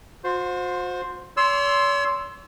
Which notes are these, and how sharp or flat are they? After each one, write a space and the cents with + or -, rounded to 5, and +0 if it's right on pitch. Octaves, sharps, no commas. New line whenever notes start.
F#4 -45 C5 +0
C#5 +45 C6 +0 E6 +0